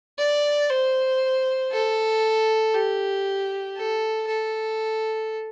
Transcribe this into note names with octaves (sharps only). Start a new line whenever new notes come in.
D5
C5
A4
G4
A4
A4